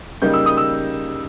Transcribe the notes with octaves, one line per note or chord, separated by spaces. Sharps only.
C#3 G3 A#3 D#4 G6
E6
D#6
E6